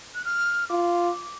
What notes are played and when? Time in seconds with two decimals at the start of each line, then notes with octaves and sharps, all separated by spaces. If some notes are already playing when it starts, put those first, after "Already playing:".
0.15 F#6
0.25 F6
0.69 F4 D6